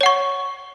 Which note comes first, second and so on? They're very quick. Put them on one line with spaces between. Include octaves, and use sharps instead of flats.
C#5 F#5 C#6